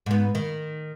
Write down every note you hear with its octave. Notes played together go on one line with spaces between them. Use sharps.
G#2 B3
D#3